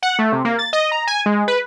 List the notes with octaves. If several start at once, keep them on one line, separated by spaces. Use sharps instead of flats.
F#5
A3
C3
A#3
A6
D#5
A#5
G#5
G#3
B4